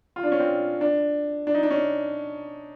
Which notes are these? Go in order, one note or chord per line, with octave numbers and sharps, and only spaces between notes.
F4
D4
C#4
C4
D4
D4
D#4
D4
C#4